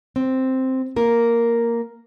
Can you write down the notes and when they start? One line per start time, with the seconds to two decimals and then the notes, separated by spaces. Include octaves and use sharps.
0.16 C4
0.96 A#3 A#4